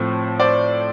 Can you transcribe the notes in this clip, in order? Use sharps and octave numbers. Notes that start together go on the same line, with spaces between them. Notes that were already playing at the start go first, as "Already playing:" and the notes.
Already playing: A2 F3 A3 C4
C5 D5